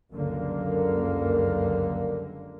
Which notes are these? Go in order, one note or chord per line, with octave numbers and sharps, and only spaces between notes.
F#1 C#2 G2 D3 A#3